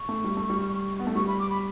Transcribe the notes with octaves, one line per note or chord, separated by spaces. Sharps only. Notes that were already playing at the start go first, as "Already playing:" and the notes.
Already playing: C#6
A3
G3
A3
G3
B3
A3
G3 C#6
B5
D6
B5